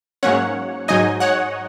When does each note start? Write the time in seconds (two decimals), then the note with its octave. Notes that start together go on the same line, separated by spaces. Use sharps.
0.23 G#2 F#3 A#3 C#4 C#5 F#5
0.88 G#2 F#3 D#4 D#5 G#5
1.20 C#5 F#5